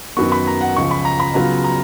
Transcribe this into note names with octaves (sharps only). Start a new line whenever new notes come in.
F#2 D#3 F#3 B3 C#6
B5
A#5
F#5
C#2 C#3 F3 C#6
B5
A#5
B5
C#3 F#3 B3 F4 A#5
A#5